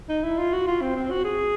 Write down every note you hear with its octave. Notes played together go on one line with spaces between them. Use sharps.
D#4
E4
F4
F#4
F4
C4
C4
F#4
G#4